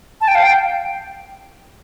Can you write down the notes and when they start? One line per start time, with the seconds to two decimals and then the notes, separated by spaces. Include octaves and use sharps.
0.21 A5
0.28 G5
0.35 F5
0.43 G5